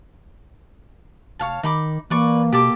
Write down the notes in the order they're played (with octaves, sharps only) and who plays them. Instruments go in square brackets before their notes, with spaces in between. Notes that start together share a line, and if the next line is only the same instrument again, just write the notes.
[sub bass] F1 [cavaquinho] C#5 F5 A5
[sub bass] D#3 [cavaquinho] D#4 B5 D6
[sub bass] E3 [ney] A#3 [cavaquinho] B4 D5 C#6
[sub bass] B2 [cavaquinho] G4 A4 D6